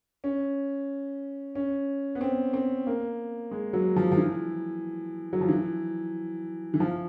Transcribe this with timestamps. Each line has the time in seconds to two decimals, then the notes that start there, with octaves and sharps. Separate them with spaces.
0.24 C#4
1.55 C#4
2.15 B3
2.21 C4
2.53 C4
2.87 A#3
3.51 G#3
3.73 F#3
3.96 F3
4.12 F3
4.17 E3
5.33 F#3
5.41 F3
5.48 E3
6.74 E3
6.80 F3